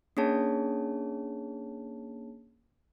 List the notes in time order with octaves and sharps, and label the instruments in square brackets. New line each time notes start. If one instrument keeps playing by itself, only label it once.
[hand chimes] A#3 C#4 D4 G#4 C#5 A5